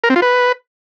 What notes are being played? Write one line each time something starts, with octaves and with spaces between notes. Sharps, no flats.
A#4
C4
F4
B4